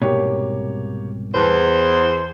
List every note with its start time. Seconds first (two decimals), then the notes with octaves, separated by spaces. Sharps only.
0.02 C2 G#2 B2 A#3 G4 C#5
1.34 E2 B4 C5 A5